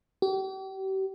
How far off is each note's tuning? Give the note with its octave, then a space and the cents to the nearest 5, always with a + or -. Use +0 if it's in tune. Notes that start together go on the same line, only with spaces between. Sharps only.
G4 -40